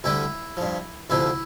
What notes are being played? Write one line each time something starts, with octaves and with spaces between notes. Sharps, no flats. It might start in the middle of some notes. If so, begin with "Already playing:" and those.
D2 D3 G3 E4
G2 F3
D2 C3 F3 E4